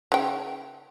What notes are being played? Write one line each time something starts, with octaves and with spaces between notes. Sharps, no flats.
C#3 G5